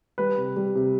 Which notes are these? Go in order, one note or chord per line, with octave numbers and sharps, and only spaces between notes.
G3 B4
C3
G3
C3